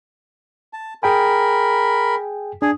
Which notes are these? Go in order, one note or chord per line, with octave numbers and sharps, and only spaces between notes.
A5
G#4 A#4 G5 G#5 B5
D4 G#4